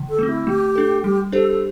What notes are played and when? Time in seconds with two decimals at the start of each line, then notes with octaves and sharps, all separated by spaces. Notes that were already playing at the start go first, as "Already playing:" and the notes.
Already playing: D3
0.09 A4
0.19 A3 C4
0.28 E4
0.47 A3 G4
0.75 D4 A4
1.04 G3 G4
1.32 D4 G4 A4 C5
1.47 A4